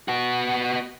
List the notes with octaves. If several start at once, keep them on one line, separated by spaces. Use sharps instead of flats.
B3 F#4